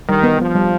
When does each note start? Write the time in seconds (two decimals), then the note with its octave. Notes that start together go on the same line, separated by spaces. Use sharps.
0.09 D#3 G3
0.23 B3
0.40 F3 B3
0.55 G3